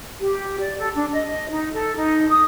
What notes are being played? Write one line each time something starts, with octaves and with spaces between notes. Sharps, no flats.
G4
D5
A4
D4
D#5
D#4
A4
D#4
D#6